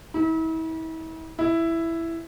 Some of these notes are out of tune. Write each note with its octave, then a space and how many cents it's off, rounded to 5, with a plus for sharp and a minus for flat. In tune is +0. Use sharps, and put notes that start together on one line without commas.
E4 -40
E4 +5